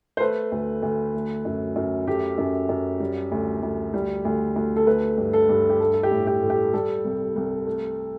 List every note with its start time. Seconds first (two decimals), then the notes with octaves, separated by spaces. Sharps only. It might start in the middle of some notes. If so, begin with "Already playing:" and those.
0.17 C5
0.20 A3 B4
0.52 D2
0.82 D2
1.14 A3
1.45 F#2
1.76 F#2
2.07 A3 G4
2.38 F#2
2.69 F#2
3.00 G3
3.32 D2
3.63 D2
3.94 G3
4.25 D2
4.56 D2
4.76 A4
4.87 A3 B4
5.18 G2
5.33 A4
5.49 G2
5.69 G4
5.80 A3 A4
5.94 A4
6.03 G4
6.11 A2
6.27 G4
6.42 A2
6.50 G4
6.74 G3 A4
7.05 C2
7.36 C2
7.66 A3